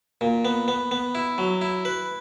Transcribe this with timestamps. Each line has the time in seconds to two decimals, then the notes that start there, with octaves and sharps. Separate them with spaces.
0.21 A#2
0.45 B3
0.68 B3
0.91 B3
1.15 E4
1.38 F#3
1.61 E4
1.85 B4